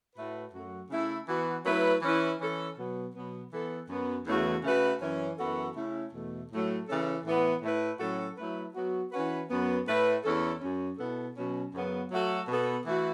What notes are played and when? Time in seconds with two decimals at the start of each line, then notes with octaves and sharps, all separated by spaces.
0.16 A2 A3 F#4 B4
0.53 F#2 F#3 A3 F#4
0.90 C#3 A3 E4 A4
1.28 E3 B3 F#4
1.65 F#3 A3 E4 B4
2.02 E3 C#4 E4 B4
2.41 E3 C#4 A4
2.78 B2 F#3 B3
3.14 B2 F#3 B3
3.52 E3 B3 A4
3.89 F#2 F#3 B3
4.27 E2 C#3 E3 A3 F#4
4.64 C#3 A3 F#4 B4
5.01 F#2 E3 C#4
5.38 F#2 E3 B3 F#4 A4
5.76 C#3 A3 C#4 E4
6.13 E2 B2 A3
6.51 A2 F#3 A3
6.88 C#3 E3 C#4 A4
7.25 A2 E3 B3
7.62 A2 A3 E4 B4
8.00 A2 F#3 C#4 F#4 A4
8.37 F#3 A3 E4 B4
8.75 F#3 B3 F#4
9.12 E3 C#4 F#4 B4
9.50 F#2 F#3 B3
9.87 A2 A3 E4 B4
10.24 E2 E3 C#4 A4
10.61 F#2 F#3 C#4
10.98 B2 B3 E4 A4
11.35 B2 F#3 C#4
11.74 F#2 C#3 F#3 B3
12.11 F#3 A3 F#4 A4
12.48 B2 B3 A4
12.86 E3 A3 F#4